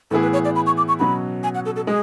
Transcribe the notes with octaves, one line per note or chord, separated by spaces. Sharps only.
A2 E3 B3 E4 G#4 A4
B4
C#5
D5
B5
C#6
D6
C#6
B2 F#3 C#4 F#4 B5
G#5
F#5
A4
A4
G#3 G#4